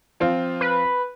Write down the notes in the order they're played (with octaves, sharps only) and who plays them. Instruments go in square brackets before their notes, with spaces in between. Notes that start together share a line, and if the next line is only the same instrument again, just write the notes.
[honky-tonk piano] F3 C4 F4
[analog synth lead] B4